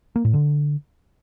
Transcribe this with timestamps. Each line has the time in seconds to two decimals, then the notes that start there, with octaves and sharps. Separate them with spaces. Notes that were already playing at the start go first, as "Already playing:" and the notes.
0.16 A#3
0.25 A2
0.34 D3